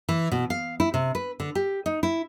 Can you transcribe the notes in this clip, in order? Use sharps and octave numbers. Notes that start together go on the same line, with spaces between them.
E3
B2
F5
E4
C3
B4
D3
G4
D#4
E4